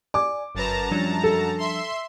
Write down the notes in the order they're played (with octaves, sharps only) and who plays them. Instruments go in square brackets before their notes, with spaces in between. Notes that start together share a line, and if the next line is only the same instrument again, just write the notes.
[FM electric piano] D5 G#5 [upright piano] D6
[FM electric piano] G1 B4 [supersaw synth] F#2 A5 A#5
[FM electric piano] F3 G3 D4
[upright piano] A4
[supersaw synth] E5 C6